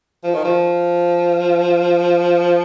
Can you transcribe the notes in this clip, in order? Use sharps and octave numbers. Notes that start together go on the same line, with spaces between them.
F3
D#3
F3